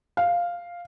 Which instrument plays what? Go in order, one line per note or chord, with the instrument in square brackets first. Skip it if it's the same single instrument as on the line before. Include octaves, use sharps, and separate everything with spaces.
[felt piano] F5